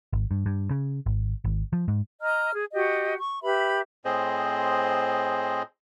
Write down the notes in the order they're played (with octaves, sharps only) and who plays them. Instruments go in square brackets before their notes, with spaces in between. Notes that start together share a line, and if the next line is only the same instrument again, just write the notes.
[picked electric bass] G#1
G2
G2
C#3
G#1
G#1
F3
G#2
[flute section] D#5 A#5 F6
G#4
F#4 G4 D#5
C#6
G4 B4 E5 B5
[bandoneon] A2 C4 G#4 C5 D#5